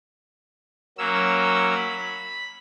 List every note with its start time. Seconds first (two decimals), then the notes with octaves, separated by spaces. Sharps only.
0.98 F#3 A#3 C#4 E6
1.75 B5